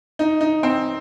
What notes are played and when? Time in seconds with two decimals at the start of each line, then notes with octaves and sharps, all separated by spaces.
0.19 D#4
0.41 D#4
0.63 C4